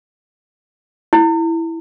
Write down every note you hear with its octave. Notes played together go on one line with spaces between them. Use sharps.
E4